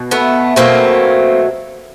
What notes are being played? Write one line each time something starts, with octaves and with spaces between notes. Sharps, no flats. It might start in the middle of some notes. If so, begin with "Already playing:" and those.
Already playing: B2
A3 B3
B2 F#3 A3 A#3 C4